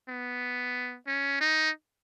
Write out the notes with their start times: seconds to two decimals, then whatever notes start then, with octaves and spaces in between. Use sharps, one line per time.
0.09 B3
1.07 C#4
1.41 D#4